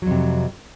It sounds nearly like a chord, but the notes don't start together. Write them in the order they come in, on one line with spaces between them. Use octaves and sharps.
F#3 F2 C3